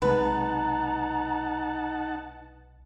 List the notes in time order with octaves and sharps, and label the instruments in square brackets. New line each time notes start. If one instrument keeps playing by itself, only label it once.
[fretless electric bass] B1 C3 G#3 [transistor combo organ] D#4 F#5 A5 [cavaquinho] B4 [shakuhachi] A#5